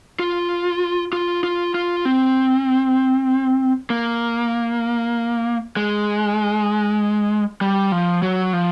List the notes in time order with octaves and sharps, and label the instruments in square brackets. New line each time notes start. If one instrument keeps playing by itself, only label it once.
[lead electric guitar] F4
F4
F4
F4
C4
A#3
G#3
G3
F3
F#3
F3